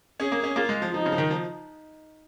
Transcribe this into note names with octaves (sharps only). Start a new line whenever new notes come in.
C#4 G#4
A#3
C#4
A#3 F4
G#3
F3
F3 D#4
C#3
F3
D#3
F3